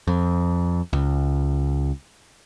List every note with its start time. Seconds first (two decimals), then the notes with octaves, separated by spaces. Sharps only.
0.07 F2
0.93 C#2